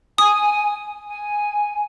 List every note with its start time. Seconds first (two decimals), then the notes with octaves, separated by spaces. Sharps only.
0.18 G#5 D#6
1.06 G#5